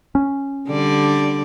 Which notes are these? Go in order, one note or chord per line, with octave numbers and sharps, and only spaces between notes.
C#4
D3 G3 D5